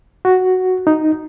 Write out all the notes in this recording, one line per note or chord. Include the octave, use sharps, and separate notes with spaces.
F#4
D#4